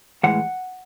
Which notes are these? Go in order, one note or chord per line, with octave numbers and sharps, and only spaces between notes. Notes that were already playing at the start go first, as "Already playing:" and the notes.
A2 E3 G#3 F#5